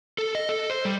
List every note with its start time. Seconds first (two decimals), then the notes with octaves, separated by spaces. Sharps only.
0.18 A4
0.35 D#5
0.49 A4
0.70 C5
0.85 G3